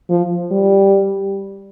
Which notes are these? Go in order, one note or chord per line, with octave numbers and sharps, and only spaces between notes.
F3
G3